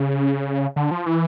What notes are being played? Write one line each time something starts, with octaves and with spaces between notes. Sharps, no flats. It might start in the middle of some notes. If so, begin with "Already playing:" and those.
Already playing: C#3
D3
F3
E3